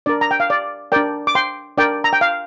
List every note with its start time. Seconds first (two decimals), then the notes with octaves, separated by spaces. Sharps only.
0.06 D4 A#4 D5
0.21 A#5
0.31 G5
0.40 F5
0.50 D5
0.92 D4 A#4 D5 G5
1.27 D6
1.35 G5 C6
1.77 D4 A#4 D5 G5
2.04 A#5
2.13 G5
2.21 F5